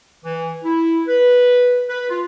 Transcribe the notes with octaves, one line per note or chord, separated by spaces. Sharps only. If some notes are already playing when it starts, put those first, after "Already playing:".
E3
E4
B4
B4
F4